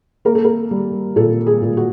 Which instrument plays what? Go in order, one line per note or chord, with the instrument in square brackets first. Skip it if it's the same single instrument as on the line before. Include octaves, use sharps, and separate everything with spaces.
[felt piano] A#3 A#4
A4
A#4
G3
A#2 A4
G#4
A#2
F#4